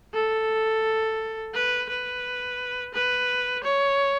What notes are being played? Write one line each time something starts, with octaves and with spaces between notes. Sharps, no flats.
A4
B4
B4
B4
C#5